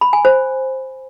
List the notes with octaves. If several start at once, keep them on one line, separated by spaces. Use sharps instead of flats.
B5
G#5
C5